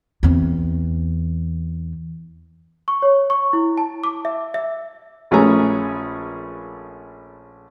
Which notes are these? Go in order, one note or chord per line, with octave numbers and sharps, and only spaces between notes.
E2 C4
C#6
C#5
C#6
E4
A5
D6
E5
E5
A#1 A3 C#4 G#4 B4 A#5